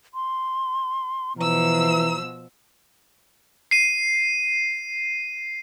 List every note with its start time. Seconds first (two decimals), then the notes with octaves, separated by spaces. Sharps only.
0.14 C6
1.39 B2 E3 F3 A#5 E6
3.71 C7 D#7